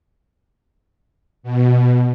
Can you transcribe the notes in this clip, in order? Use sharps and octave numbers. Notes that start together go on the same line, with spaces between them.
B2